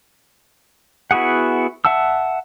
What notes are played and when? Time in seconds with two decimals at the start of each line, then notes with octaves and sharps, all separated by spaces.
1.11 B3 E4 F#4 G#4 F#5
1.85 E5 F#5 A5 E6